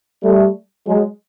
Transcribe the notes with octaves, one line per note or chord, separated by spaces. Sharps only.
G3 A3
F#3 G#3